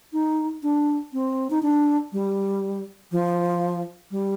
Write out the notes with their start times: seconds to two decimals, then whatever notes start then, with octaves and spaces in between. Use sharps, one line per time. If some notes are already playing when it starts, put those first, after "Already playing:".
0.13 D#4
0.63 D4
1.13 C4
1.50 D#4
1.62 D4
2.12 G3
3.12 F3
4.11 G3